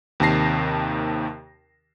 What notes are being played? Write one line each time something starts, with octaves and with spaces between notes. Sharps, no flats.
D#2 C3 D#3 A5 A#6 C7